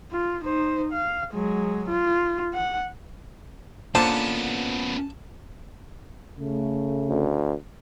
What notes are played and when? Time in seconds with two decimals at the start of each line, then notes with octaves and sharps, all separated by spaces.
0.12 F4
0.44 D#4 C5
0.92 F5
1.34 F#3 G#3
1.89 F4
2.54 F#5
3.95 D3 A#3 B3 C#4 F4 C5 A5
6.38 C#3 A3
7.09 D2